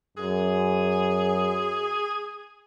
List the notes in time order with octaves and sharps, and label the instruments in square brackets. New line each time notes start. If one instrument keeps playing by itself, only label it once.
[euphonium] F#2 [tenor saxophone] G#4